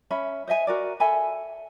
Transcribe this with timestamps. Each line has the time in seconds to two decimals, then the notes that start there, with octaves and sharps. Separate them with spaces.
0.11 C#4 E5 B5
0.48 C5 D#5 E5 G#5
0.67 F#4 A#4 D5
1.00 A4 E5 G#5 B5